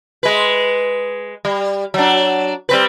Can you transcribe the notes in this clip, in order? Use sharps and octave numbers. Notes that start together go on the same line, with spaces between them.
G#3 B4
G3
F#3 D4
G3 C4 B4